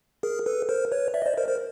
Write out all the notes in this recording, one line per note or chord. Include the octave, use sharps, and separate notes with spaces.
G#4 A#4
A4 B4
A#4 C5
B4 C#5
D5 E5
D#5
C5 D5
A#4 C5
A#4 C5